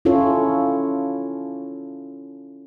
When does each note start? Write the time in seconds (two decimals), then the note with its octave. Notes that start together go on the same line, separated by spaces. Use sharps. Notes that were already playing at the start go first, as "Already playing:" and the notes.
0.05 C#4 E4 F4 A4 C#5